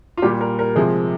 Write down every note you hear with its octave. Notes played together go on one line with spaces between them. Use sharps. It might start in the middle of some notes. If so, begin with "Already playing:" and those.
F4
A#2 G3 G4
A#4
A#4
C3 F3 G#3 G#4